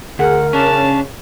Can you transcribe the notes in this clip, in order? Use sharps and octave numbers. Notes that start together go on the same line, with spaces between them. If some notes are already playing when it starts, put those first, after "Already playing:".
D2 G#4 A#4 F#5
C#3 C#4 D4 A5